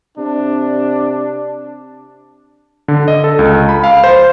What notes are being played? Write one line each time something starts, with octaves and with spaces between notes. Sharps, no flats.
C3 D4
D3
D#5
A4
C#2
B5
F5
C5